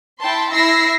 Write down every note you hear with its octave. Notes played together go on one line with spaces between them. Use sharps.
E4 G5 A5 C6
E4 E5 E6 A#6 C7